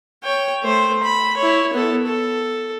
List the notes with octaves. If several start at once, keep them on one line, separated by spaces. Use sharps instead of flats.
C#5 G5
A3 C5
B5
E4 C#5
B3 A4
A4